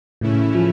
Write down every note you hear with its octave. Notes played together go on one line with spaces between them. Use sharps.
A2 C#3 E3 A3 C#4 E4
F3